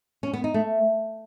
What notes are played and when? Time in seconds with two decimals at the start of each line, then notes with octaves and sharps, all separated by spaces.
0.23 C#4
0.33 B3
0.44 D#4
0.54 A3